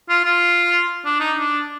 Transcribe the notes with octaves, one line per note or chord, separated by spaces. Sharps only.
F4
F4
D4
D#4
D4